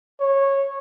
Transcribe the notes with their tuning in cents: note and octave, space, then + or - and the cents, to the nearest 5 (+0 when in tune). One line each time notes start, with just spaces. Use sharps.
C#5 -15